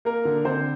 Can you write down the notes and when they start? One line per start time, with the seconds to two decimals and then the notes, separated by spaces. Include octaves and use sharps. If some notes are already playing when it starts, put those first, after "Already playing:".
0.05 A#3 A#4
0.25 D3
0.45 D3 C4 C5